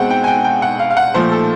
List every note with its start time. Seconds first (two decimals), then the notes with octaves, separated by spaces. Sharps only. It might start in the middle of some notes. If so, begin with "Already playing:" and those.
Already playing: B2 G#3 C4 F#5 G5
0.10 G5
0.24 G#5
0.27 G5
0.44 G5
0.62 F#5
0.79 F5
0.90 F5
0.97 F#5
1.14 A#2 F3 A3 C5
1.32 A4